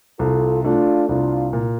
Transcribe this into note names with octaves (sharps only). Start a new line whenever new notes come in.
C2 F4 A4
A3 D4 F4
C2 D4 F4
A#2